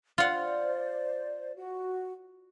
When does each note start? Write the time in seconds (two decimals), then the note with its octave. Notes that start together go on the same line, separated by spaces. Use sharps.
0.18 F4 C5 D5 F#5
1.57 F#4